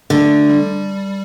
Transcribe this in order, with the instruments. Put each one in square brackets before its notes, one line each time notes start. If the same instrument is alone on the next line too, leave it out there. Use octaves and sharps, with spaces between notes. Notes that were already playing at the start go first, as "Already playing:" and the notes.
[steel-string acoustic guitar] D3 [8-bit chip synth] A3
[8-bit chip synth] G3